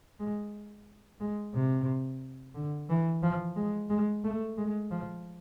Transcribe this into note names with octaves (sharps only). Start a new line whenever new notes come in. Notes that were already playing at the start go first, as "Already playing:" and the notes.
G#3
G#3
C3
D3
E3
F3
G#3
G#3
A3
G#3
F3